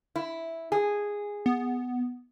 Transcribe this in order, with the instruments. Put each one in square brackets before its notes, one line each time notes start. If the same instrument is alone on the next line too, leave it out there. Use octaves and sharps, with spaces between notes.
[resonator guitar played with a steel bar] E4
G#4
[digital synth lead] B3